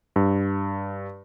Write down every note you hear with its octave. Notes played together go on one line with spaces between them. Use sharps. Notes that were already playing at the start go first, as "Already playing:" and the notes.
G2